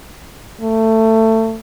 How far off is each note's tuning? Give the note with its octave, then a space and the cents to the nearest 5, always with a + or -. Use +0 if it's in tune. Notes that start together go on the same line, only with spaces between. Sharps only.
A3 +20